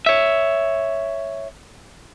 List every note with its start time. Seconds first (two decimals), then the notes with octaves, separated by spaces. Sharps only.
0.06 C#5 E5